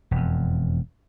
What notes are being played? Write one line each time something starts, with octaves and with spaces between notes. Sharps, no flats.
E1 F2